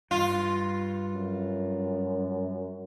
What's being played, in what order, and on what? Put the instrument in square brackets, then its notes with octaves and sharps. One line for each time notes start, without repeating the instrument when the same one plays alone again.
[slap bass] G2 [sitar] F4
[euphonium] F#2